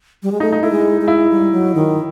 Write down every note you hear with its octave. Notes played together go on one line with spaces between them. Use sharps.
G3
G#3
A3 D#4
D#4
A3 E4
G#3
G#3
E4
G3
F#3
D#3